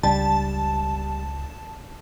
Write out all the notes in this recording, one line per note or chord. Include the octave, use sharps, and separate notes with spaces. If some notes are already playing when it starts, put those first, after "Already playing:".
C#2 G3 D4 A5